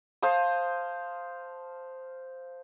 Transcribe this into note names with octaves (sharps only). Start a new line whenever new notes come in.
C5 F5 A5 D#6